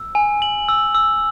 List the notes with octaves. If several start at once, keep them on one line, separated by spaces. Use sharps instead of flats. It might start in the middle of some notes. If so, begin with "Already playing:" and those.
Already playing: E6
G#5
F#7
E6
E6